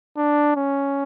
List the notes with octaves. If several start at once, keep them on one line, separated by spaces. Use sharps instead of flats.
D4
C#4